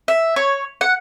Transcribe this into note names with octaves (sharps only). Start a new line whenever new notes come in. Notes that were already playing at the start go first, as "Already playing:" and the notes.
E5
C#5
F#5